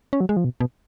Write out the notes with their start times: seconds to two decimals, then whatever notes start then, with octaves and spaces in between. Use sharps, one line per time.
0.13 C#4
0.21 F#3
0.29 G#3
0.37 F3
0.45 B2
0.60 B2